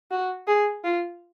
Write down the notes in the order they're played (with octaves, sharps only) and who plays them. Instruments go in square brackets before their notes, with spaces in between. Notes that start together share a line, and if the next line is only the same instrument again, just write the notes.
[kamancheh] F#4
G#4
F4